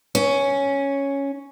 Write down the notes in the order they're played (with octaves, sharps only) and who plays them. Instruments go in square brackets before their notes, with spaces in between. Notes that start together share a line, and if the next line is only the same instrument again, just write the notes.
[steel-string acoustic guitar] C#4